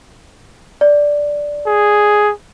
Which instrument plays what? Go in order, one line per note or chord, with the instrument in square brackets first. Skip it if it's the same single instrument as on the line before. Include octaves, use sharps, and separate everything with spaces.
[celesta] D5
[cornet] G#4